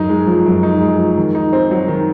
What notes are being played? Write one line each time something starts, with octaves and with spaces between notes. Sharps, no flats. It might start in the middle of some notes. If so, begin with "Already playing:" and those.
Already playing: F#2 D#4
G#3
F3
F#2
D#4
G#3
F3
D#3
D#4
C4
F#3
D#3